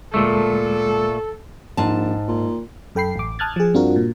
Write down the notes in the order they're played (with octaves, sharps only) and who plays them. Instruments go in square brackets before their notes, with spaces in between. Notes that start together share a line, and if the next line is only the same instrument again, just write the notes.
[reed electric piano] D2 G#3 E6 [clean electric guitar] A#2 A3 [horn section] A4
[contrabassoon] A#1 [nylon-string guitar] G#2 A5
[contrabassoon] A#2
[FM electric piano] F#2 A4 G5 B5 C7
A1 D6
A5 D#6 F6 F#6 G#6 A6
F3 G#4
G2 C4 D4 F4 F#4 A#4
A#2